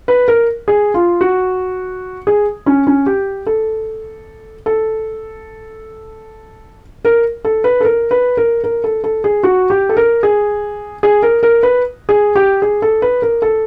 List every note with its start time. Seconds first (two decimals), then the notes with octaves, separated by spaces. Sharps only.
0.08 B4
0.28 A#4
0.68 G#4
0.94 F4
1.21 F#4
2.27 G#4
2.66 C#4
2.87 C#4
3.06 G4
3.46 A4
4.66 A4
7.05 A#4
7.45 A4
7.64 B4
7.80 A4
7.85 A#4
8.11 B4
8.37 A#4
8.64 A#4
8.84 A4
9.04 A4
9.24 G#4
9.43 F#4
9.70 G4
9.89 A4
9.97 A#4
10.23 G#4
11.03 G#4
11.23 A#4
11.43 A#4
11.63 B4
12.09 G#4
12.35 G4
12.62 G#4
12.82 A4
13.02 B4
13.22 A#4
13.42 A4